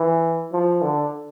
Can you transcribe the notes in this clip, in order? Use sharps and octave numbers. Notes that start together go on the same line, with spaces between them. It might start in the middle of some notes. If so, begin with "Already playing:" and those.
Already playing: E3
F3
D3